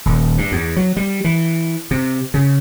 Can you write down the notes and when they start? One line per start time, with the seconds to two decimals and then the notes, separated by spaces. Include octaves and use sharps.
0.06 D#1
0.38 G2
0.52 E2
0.76 F#3
0.97 G3
1.24 E3
1.91 C3
2.34 C#3